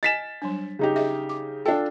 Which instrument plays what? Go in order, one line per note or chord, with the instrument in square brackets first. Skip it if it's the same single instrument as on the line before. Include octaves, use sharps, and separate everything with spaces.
[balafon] D#5 G#5 [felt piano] A6 B6 E7
[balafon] F#3 G3 D4
[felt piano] C#3 D#4 G4
[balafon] G#4 D#5 E5
D6
[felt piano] D4 F4 A4 [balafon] G5